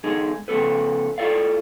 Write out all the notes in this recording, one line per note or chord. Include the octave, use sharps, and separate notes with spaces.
E2 D3 G#3 D#4 G#4
C#3 F3 A#3 B3 A4 B4
E4 F4 G4 A4 D5 F5